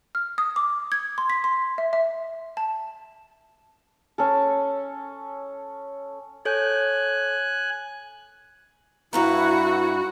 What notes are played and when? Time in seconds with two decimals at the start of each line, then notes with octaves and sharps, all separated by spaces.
0.15 F6
0.38 D#6
0.56 D6
0.92 G#6
1.18 C6
1.30 B6
1.44 C6
1.78 E5
1.93 E5
2.57 A5
4.18 C#4 A4
6.45 A4 C#5 G#5 F#6 G6
9.13 G2 E4 F#4 B4 A#5